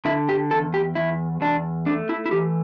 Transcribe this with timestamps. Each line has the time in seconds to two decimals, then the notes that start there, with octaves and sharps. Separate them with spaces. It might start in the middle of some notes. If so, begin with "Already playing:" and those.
0.05 D3 E4
0.29 G4
0.51 E2 A4
0.74 G4
0.95 E2 E4
1.41 E2 D4
1.86 A3 D4
2.09 E4
2.26 E4
2.31 E3 G4